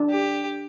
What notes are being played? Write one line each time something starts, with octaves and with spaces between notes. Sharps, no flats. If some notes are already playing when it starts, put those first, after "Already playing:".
Already playing: D4
G4